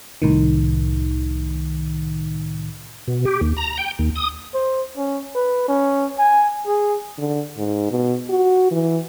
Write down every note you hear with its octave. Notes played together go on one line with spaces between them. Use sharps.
C2 A2 D#3
B2
G4
D#2
A#5
G5
D#2
D#6
C5
C#4
B4
C#4
G#5
G#4
D3
G#2
B2
F#4
E3